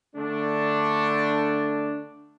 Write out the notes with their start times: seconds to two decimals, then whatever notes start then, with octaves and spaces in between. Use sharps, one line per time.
0.15 D3 A3 D4